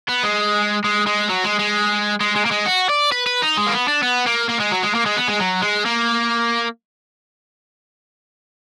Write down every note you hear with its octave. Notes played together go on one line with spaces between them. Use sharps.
B3
G#3
G#3
G#3
F#3
G#3
G#3
G#3
G#3
A#3
G#3
F#4
D5
B4
B4
D#4
G#3
A#3
B3
D4
B3
A#3
A#3
G#3
F#3
G#3
A#3
G#3
B3
G#3
F#3
G#3
A#3